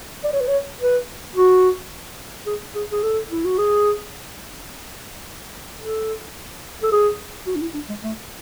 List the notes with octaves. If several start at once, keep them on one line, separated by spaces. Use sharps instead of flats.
D5
C#5
B4
C#5
B4
F#4
G#4
G#4
G#4
A4
E4
F#4
G#4
A4
A4
G#4
F#4
D4
E4
D4
G#3
A3